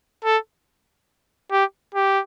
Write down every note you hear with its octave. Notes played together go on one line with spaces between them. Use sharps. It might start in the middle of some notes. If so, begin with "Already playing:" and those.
A4
G4
G4